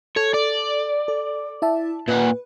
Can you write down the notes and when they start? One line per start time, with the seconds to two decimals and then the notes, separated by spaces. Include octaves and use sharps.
0.16 A4 C#5
0.34 D5
1.08 A4
1.62 E4 E5 A5
2.08 A#2 B4 F#5